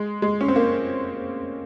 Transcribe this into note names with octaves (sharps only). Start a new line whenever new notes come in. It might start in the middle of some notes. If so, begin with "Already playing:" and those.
Already playing: G#3
G#3
C#4
C4
A#3